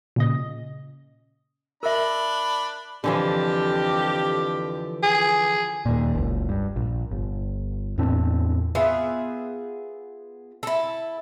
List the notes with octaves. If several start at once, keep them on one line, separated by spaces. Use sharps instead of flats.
A#2 C#3 D#5
D4 A#4 E5 B5
F2 D3 E3 F3 G4
G#4
D#2 A#2
F#1 C#2
G2
A#1
G1
E2 A2 C4 D4
B3 F4 G#4 E5
E4 A4